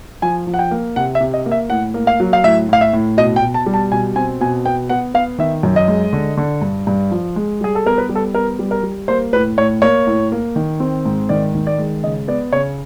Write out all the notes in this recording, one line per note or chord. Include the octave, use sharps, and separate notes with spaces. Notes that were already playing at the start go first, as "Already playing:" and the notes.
F3 G#5
F3
F#5
G5
A#3
C3 F#5
E5
C3
D#5
A#3
E5
A2 F#5
A#3
F5
F#3
F5
A2 E5
A2 F5
E5
A2
B2 D#5
G5
B2
A5
G3
A5
B2 G#5
C4 G#5
B2 G#5
B3 G5
B3 F#5
B3 F5
D#3 E5
F#2
D#5
G#3
D3
D3
G2
G2
F3
G#3
G3 G#4
A4
B3 A#4
B4
G3
A4
B3 A#4
G3
A#4
G3
A#3 C5
A2 B4
A2 C#5
A#3 C#5
A2
A#3
D#3
C4
G#2
D#3 D5
D#3
D5
G#3
C#3 D#5
B3 D5
C#3 C#5